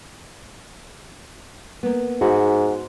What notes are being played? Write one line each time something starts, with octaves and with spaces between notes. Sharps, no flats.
A#3 B3
G#2 F#4